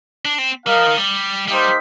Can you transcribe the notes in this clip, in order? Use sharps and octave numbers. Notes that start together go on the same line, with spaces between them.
D4
C4
G3 D#4 A#4 F5
F3
D#3
G3
G3 A#3 D#4 G4 C5 G5